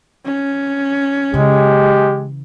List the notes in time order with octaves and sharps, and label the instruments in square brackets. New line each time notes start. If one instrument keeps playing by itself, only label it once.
[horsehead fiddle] C#4
[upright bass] C#3 E3 [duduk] G#3 [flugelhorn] G4